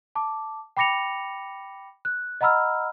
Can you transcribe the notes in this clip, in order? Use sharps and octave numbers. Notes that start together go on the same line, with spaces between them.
A5 D6
G5 B5 D6 A#6 C#7 F7
F#6
D#5 F#5 A#5 B5 E6 F6